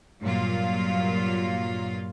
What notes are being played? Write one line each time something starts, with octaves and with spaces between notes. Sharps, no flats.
G2 A#2 F#3 A#3 F4